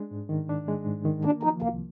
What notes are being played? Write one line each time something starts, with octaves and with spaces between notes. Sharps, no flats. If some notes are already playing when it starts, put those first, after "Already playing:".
Already playing: G#3 D4
G#2
D#3
D4
G#3
G#2
D#3
A#3 D4
F3 D#4
C2 A#3